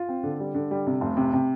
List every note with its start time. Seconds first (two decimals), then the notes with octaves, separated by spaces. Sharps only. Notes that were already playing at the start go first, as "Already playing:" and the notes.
Already playing: F4
0.09 C4
0.23 D3
0.40 G3
0.54 D3
0.71 G3
0.87 C3
1.01 F1
1.17 C3
1.33 C3